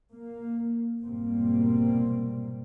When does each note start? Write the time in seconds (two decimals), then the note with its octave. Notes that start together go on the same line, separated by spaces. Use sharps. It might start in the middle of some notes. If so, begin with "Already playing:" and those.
0.13 A#3
1.02 F1 G#2 B2 G3 A#3 C4